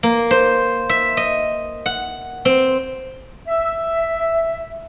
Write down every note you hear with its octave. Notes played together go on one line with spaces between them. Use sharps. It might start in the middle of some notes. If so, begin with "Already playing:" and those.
A#3
C5
E5
D#5
F#5
C4
E5